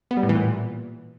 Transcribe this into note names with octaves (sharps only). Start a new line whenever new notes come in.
B3
G3
A2
E3
A#2